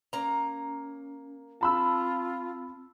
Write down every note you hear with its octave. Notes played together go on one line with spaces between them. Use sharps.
A#3 C#4 A#5
C4 F4 A5 B5 E6